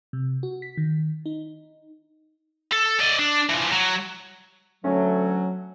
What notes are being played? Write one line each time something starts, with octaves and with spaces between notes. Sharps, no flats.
C3
F#4
B6
D#3
D#4
A4
D5 D#5
D4
E3 F3
F#3
D2 F#3 A3 C#4